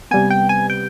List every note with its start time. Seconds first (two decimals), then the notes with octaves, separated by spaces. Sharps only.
0.11 C3 G3 B3 G#5
0.30 G5
0.49 G#5
0.70 G5